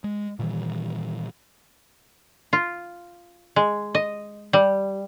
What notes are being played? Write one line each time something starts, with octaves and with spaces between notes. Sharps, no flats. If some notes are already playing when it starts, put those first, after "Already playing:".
G#3
A#2 D#3 E3 G3
F4
G#3
D#5
G3